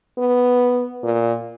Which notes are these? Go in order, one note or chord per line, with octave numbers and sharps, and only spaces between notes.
B3
A#2